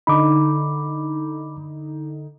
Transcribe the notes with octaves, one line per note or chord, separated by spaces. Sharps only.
D3 D#4 B5 D6